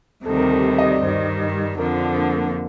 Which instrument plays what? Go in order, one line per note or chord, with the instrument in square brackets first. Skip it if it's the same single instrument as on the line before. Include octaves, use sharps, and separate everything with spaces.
[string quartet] D2 C3 D#3 G3 [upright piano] A4
[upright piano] A#4
A4
D#5
D5
[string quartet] G2 D#3 G3 [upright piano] C5
[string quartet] F2 D3 F3 [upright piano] A#4
[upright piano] D4
A#3
A#3
A#3